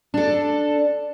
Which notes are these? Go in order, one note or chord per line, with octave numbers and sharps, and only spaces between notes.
D4 A4